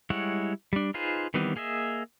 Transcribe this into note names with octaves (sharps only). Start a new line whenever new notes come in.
G3 G#3 E4 C#5 F#5
G3 D4
D#4 F4 G#4 B4 C5
D#3 E3 G3 B3 C4
A#3 G#4 D#5 E5